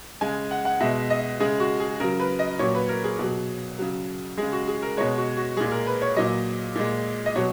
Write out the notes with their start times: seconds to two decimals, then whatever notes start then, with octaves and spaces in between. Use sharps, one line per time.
0.21 C#3 G#3 G#5
0.51 F#5
0.65 F#5
0.81 B2 G#3 E5
1.10 D#5
1.40 C#3 G#3 G#4
1.60 F#4
1.80 G#4
2.00 C#3 F#3 A#4
2.20 B4
2.39 D#5
2.59 A#2 F#3 C#5
2.75 B4
2.89 A#4
3.04 G#4
3.19 B2 F#3
3.79 C#3 F#3
4.37 C#3 G#3 G#4
4.52 F#4
4.68 G#4
4.82 A#4
4.97 B2 G#3 C#5
5.17 F#4
5.37 F#4
5.57 A#2 G#3 G#4
5.72 A#4
5.87 B4
6.02 C#5
6.16 A#2 F#3 D#5
6.76 A#2 G#3
7.26 D#5
7.36 B2 F#3 C#5